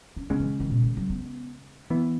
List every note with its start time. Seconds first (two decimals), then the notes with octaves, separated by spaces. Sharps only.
0.16 C#4
0.29 C#3 G#3 B3 C#4
0.40 E3
0.60 D#3
0.70 B2
0.83 D#3
0.97 F#3
1.10 B3
1.90 E3 B3